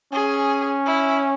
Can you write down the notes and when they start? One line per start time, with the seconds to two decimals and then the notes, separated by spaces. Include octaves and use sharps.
0.13 C#4 G#4
0.87 E4